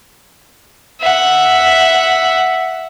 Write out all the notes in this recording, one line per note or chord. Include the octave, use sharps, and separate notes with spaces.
E5 F#5